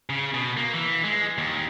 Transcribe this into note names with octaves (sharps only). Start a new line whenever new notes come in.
C#3
B2
A#3
E3
G#3
D#2